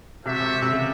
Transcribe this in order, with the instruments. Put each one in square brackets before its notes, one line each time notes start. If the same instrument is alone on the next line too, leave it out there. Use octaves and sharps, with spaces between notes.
[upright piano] C3 [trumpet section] F#4 A4 C5 E5
[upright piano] C3
C3
C#3